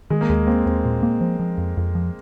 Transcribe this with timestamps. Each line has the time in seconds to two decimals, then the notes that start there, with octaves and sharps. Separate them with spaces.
0.10 D#3 G#3
0.21 A#3
0.29 D#2 G#3
0.47 A#3 C4
0.66 D#2 C4
0.85 A#2
1.03 A#3
1.21 F3
1.39 F3
1.58 F2
1.77 F2
1.95 F3